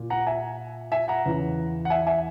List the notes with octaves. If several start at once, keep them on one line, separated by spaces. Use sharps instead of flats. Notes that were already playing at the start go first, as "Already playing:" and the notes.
Already playing: A#2
F#5 A#5
E5 G#5
E5 G#5
F#5 A#5
E2 C#3 E3
F#5
E5 G#5
E5 G#5